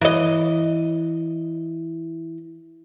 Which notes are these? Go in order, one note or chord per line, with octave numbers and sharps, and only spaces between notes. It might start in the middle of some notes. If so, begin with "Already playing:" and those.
E3 D#5